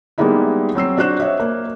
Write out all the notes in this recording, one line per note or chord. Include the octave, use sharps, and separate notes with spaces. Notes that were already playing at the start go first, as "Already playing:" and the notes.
G3 G#3 A#3 B3 D#4 E4
F#3 C4 E6 C7
D4 F#4 C5 F#6 E7
C#5 D#5 E5
A#3